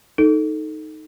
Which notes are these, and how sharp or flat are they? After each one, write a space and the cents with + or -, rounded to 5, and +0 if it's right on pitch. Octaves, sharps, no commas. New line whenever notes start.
D#4 +0 A4 +0